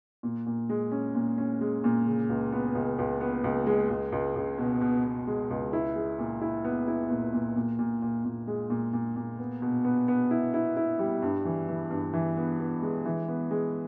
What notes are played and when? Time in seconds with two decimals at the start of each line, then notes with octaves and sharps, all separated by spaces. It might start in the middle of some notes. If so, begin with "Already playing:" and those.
0.23 A#2
0.46 A#2
0.69 G#3
0.92 C#4
1.15 A#2
1.38 C#4
1.61 G#3
1.84 A#2
2.06 C#3
2.29 C#2
2.52 B3
2.75 C#2
2.98 C#2
3.21 B3
3.44 C#2
3.67 G#3
3.90 C#2
4.12 C#2
4.36 C#2
4.58 B2
4.81 B2
5.04 B2
5.27 G#3
5.50 C#2
5.73 E4
5.95 G#3
6.19 A#2
6.42 E4
6.64 B3
6.88 E4
7.10 A#2
7.33 A#2
7.56 A#2
7.79 A#2
8.02 A#2
8.25 A#2
8.47 G#3
8.70 A#2
8.93 A#2
9.16 A#2
9.39 B3
9.62 B2
9.85 B3
10.08 B3
10.31 E4
10.54 E4
10.77 E4
10.99 G3
11.22 G2
11.45 E3
11.69 E3
11.91 G2
12.13 E3
12.37 B3
12.60 B3
12.82 G#3
13.05 E3
13.28 B3
13.51 G#3